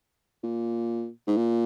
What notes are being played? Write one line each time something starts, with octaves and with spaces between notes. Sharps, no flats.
A#2
G#2
A#2